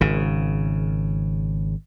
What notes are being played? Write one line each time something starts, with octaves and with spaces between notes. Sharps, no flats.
G#1 C#3